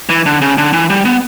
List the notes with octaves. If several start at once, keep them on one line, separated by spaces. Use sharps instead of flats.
E3
D3
C#3
D3
E3
G3
B3